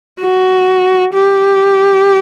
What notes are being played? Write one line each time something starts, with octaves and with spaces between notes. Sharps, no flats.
F#4
G4